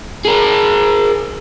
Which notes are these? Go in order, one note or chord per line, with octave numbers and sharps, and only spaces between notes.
G#4 A#4